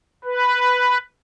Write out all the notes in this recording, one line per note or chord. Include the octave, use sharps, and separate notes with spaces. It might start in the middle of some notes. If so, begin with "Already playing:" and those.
B4